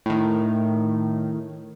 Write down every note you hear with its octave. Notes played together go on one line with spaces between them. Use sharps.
A2 D#3